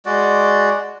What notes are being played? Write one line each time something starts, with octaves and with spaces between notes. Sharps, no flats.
G#3 F#4 D5